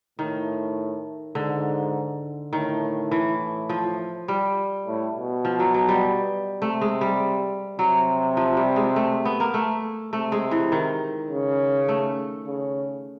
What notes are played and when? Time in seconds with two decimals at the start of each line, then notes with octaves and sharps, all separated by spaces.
0.19 A2 D#3
1.35 G#2 D3
2.53 A2 D#3
3.11 E3
3.69 F3
4.28 G3
4.87 A2
5.16 B2
5.45 F3
5.60 F#3
5.74 F#3
5.88 G3
6.62 C3 A3
6.81 G#3
7.01 G3
7.79 C3 F#3
8.37 F3
8.57 G3
8.76 G#3
8.96 A3
9.25 B3
9.40 A#3
9.54 A3
10.13 C3 A3
10.32 G#3
10.51 E3
10.72 D#3
11.30 C#3
11.88 A3
12.47 C#3